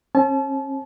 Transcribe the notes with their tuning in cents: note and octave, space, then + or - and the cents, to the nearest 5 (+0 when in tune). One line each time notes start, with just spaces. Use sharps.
C#4 -45 A5 -40